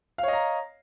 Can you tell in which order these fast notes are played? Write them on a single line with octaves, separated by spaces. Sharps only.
F5 C#5 D#5 A#5